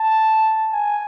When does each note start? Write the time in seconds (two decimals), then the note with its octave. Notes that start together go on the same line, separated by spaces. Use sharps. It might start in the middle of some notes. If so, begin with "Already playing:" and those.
Already playing: A5
0.73 G#5